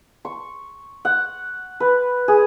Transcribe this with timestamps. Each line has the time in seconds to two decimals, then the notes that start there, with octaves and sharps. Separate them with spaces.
0.25 C#6
1.05 F#5
1.80 B4
2.28 G#4